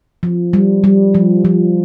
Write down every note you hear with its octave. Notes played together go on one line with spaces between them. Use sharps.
F3
G3
G3
F3
F3